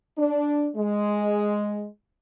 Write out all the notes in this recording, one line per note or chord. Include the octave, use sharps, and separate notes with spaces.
D4
G#3